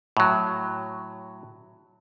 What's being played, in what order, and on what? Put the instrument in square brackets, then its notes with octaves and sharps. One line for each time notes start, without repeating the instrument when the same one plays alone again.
[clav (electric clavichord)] A2 F#3